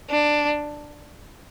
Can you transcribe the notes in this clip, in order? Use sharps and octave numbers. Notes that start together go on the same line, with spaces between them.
D4